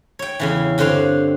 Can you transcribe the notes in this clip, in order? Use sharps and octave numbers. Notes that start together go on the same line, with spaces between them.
C#5 G5
E2 C#3 E3
G2 D3 C4 C5 C#5 F5